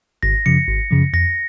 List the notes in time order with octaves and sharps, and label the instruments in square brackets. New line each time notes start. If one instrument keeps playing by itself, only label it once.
[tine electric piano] G#1 [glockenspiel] A#6
[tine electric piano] F#2 C#3 F3 [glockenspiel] C#7
[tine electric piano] G#1
F#2 C#3 F3
[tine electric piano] F2 [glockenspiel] A#6